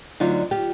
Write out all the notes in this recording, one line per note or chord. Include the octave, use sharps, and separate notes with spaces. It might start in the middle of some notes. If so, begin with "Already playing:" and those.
D2 D3 F#3 D#4 F4
F4 G4